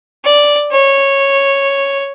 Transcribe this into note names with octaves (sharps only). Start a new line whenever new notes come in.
D5
C#5